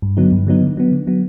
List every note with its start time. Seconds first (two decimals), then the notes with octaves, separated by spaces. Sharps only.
0.02 G2
0.17 D3 F#3 B3 D#4
0.32 G2
0.47 D3 F#3 B3 D#4
0.62 D3
0.77 F#3 B3
0.92 D3
1.07 F#3 B3